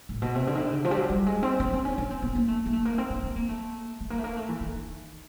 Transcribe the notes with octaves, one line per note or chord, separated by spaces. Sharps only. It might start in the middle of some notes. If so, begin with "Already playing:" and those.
A2
B2
C3
D3
D#3
D3
C#3
F3
G3
F#3
G3
G#3
C4
C#4
C4
C#4
C#4
C4
B3
A#3
A3
A#3
A3
A#3
C4
C4
C4
A#3
A3
A3
A#3
A3
A#3
A3
E3
D#3